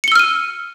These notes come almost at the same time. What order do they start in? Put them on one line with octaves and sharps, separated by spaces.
C#7 G7 E6 F6 D#7